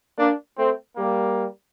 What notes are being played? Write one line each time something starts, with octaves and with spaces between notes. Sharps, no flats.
A#3 D4
A3 C4
G3 A#3